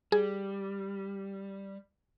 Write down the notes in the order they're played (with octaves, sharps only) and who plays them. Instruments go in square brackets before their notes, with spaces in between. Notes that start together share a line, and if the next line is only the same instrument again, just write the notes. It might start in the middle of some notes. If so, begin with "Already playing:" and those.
[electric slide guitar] G3 [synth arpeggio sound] G#4